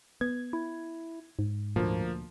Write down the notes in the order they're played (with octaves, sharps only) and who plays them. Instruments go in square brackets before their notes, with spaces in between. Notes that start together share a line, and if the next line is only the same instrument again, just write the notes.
[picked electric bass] B3 [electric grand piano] G#6
[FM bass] E4
G#2
[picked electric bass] D2 A#2 [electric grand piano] F3 A#3